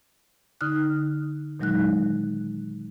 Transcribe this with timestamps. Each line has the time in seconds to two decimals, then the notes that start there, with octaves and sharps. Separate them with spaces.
0.61 D3 D#4 D#6 F6 F#6
1.60 A#2 D#3 F#3 G#3 D#4 F#6